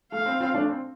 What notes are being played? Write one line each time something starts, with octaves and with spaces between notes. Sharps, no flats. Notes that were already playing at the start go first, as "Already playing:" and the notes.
A3 F5
C4
C4 F4
A3 D4
C4